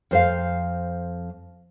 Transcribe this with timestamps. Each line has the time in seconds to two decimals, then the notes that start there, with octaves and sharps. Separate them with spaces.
0.11 F2 C5 F5